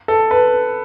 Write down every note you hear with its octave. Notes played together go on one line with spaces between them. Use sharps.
A4
B4